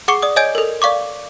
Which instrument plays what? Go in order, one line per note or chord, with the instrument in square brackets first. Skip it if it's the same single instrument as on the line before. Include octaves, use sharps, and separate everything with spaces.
[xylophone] G#4 F#5 C#6 D6 C#7 G7
D5 D#6
C#5 D#5 G#5 G6 G#6 D7
A4 A#4
D5 F5 C#6 D6